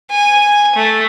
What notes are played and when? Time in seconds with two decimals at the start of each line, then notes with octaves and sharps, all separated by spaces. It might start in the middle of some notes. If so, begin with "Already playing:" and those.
0.11 G#5
0.75 A3